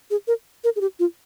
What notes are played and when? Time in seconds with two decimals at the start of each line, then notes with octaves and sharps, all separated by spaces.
0.11 G#4
0.27 A#4
0.64 A#4
0.76 G#4
0.81 G4
0.99 F4